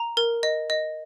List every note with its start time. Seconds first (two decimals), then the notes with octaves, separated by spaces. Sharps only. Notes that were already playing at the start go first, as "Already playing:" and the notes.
Already playing: A#5
0.17 A#4
0.43 D#5
0.70 D#5